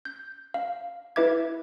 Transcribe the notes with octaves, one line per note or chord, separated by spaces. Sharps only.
G6
F5
E4 B4 E5 D6 G#6